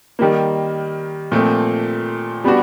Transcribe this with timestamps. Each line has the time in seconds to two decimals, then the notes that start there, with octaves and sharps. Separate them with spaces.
0.19 D#3 G3 A#3
1.32 A#2 F3 A3 C4
2.44 G3 B3 D4 F#4